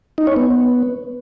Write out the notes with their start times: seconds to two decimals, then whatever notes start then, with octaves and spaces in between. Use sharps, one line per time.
0.18 D#4
0.27 C#5
0.36 B3